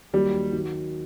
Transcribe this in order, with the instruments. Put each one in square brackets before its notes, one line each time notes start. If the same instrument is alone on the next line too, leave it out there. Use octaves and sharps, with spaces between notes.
[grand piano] D#2 D#3 F#3 [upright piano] G3
[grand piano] D#3 F#3